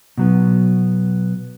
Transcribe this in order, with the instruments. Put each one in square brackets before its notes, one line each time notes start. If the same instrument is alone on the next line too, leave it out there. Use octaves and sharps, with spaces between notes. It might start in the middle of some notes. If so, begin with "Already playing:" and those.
[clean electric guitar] B2 F#3 B3